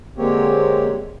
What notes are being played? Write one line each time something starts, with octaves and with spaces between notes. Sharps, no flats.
D3 G#3 A#3 C4 G4 C#5